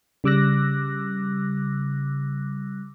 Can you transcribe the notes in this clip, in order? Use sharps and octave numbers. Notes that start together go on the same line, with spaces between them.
C#3 G3 D6 E6 F#6 A#6